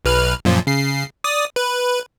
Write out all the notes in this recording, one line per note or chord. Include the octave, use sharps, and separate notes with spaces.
B1 B4 F6
F#2 A#2 F3
C#3 C7
D5 D#6
B4